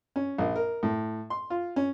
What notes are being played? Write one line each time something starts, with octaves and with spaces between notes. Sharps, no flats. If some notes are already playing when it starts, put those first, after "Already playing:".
C#4
A#1
A#4
A2
C6
F4
C#4